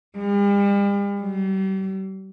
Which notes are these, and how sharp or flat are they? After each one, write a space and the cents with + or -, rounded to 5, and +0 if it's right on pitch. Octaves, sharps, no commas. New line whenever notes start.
G3 +45
G3 -40